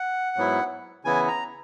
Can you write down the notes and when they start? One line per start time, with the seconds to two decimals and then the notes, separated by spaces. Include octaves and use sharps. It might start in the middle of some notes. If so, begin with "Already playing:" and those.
Already playing: F#5
0.36 G#2 F#3 B3 E4
1.05 C#3 E3 B3 E4 G#5
1.28 A#5